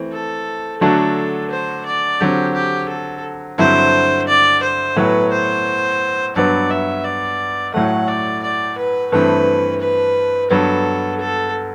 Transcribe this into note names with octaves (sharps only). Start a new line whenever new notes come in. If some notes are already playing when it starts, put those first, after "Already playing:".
Already playing: E3 A3 C4
A4
D3 F#3 A3 D4 F#4 A4
C5
D5
D3 F#3 C4 G4
G4
A4
G2 D3 F#3 C4 E4 C5
D5
C5
A2 F#3 B3 F#4 B4
C5
G2 F#3 B3 D5
E5
D5
A2 F#3 A3 F#5
D5
D5
B4
G2 E3 A3 C4 B4
B4
G2 F#3 B3 A4
A4